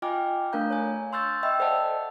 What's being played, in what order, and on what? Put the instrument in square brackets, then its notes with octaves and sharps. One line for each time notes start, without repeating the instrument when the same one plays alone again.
[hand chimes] F4 D#5 G5 G#5 D6 F6
A3 D4 A#4 F5 A#5 G6
C#5 G#5
C6 C#6 E6 F6 G6 A6
D#5 E5 G5 B5 E6
A4 C5 D5 D#5 F#5 A5